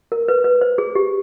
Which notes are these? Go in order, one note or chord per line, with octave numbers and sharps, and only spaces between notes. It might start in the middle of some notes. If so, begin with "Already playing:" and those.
A#4
B4
B4
C5
G#4
G4